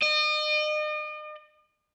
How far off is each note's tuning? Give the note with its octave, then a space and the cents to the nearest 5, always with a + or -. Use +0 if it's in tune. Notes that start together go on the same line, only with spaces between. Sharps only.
D#5 -40